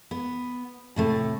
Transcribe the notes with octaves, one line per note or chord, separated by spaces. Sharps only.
B3
A2 C3 A3